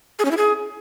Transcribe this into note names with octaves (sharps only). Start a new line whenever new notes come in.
G#4
C#4
E4
G#4